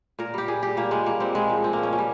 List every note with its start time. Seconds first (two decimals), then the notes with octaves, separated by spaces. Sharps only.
0.19 A#2 A#4
0.34 G3 G4
0.48 A#2 G#4
0.62 G3 G4
0.77 A#2 A#3
0.91 G3 G#3
1.06 A#2 A#3
1.20 G3 C4
1.35 A#2 G#3
1.49 F3
1.64 A#2 C4
1.73 A#3
1.78 F3 C#4
1.92 A#2 C#4
1.98 G3